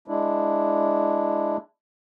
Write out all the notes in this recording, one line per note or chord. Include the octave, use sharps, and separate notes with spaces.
G#3 D4 E4